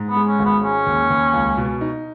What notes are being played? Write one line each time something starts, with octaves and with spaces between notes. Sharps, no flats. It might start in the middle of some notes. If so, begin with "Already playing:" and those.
Already playing: G#2
B3
G#3
C#4
G#1
B3
G#3 C#4
D#2
D#2
C#2
B2
D#4